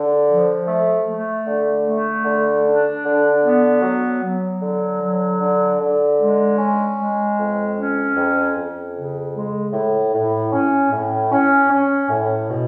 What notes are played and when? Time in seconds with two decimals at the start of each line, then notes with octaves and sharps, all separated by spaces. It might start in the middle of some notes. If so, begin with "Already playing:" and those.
Already playing: D3
0.28 F3
0.67 A3
1.06 A3
1.47 D3
1.85 A3
2.24 D3
2.65 D4
3.04 D3
3.44 B3
3.82 F#3
4.22 F#3
4.61 D3
5.01 F#3
5.40 D3
5.79 D3
6.20 G#3
6.58 C#4
6.98 G#3
7.37 F2
7.77 C#4
8.17 F2
8.55 F2
8.95 C#3
9.35 G#3
9.73 A2
10.14 A2
10.52 C#4
10.92 A2
11.31 C#4
11.70 C#4
12.10 A2
12.49 B2